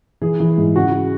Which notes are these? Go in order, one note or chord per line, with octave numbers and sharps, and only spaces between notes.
E3 G#4
E3
G#2
C#3 F#4